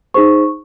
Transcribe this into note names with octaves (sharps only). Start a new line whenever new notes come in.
D#4 G#4 C5 C#6